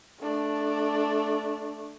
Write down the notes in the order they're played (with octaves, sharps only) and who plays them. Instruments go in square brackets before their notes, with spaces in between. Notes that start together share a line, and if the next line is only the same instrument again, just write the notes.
[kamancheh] A3 D4